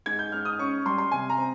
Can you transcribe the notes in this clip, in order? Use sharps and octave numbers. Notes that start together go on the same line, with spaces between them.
G#2 G#6
G6
G#2 F6
D#6
C#4 C#6
G3 C6
C6
C3 G#5
A#5
C4